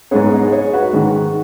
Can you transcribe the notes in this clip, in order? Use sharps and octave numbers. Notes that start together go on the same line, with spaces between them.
G#2 G#3 B3 G#4 C#5
D#4 G#4
G#4 C#5
F#4 B4
G#2 D#3 G#3